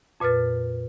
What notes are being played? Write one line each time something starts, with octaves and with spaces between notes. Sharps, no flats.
F2 A#2 B4 F6 A6